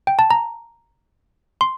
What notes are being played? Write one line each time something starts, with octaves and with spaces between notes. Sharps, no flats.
G5
A5
A#5
C6